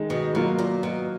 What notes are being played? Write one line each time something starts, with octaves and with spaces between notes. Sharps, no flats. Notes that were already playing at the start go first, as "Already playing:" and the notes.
Already playing: D#3 G#3 D#4
B2
B2 F#3 A#3 F4
A#2
B2